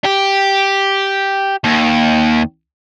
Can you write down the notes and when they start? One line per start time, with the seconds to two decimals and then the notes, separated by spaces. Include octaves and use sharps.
0.04 G4
1.64 D#2